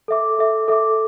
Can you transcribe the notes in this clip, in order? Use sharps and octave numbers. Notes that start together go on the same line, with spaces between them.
A4 E5 D6
A4 E5 D6
A4 E5 D6